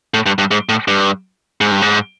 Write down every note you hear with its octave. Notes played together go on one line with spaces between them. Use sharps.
A2
G2
G2
G#2
A2
G2
G#2
G2
G#2